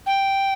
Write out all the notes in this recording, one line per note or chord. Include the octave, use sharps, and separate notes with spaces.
G5